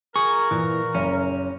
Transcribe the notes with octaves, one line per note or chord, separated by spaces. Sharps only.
F4 G#4 A#4 C#6
A#2 E3
F#1 C#4